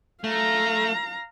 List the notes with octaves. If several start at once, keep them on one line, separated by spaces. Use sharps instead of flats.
A3 F5 A#5